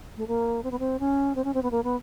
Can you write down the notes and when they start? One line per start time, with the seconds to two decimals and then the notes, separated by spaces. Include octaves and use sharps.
0.17 A3
0.27 A#3
0.63 C4
0.71 B3
0.79 C4
0.99 C#4
1.35 C4
1.44 C#4
1.54 C4
1.63 B3
1.71 A#3
1.83 B3